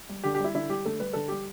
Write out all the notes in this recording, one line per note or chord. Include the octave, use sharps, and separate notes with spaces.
G3
D3 G4
G4
G3 E4
D3 E4
G3 G4
D3 A3 A4
G3 B4
D3 A4
G3 G4